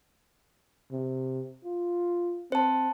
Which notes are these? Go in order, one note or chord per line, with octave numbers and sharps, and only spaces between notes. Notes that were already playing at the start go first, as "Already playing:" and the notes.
C3
F4
C4 C5 A5